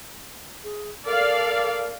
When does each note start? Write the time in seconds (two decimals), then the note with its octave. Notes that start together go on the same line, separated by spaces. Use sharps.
0.63 G#4
1.05 A4 A#4 D5 F5